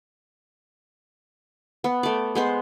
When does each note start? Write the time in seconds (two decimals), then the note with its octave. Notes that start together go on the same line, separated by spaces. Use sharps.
1.84 B3
2.03 A3 D5
2.35 G#3 B3 C5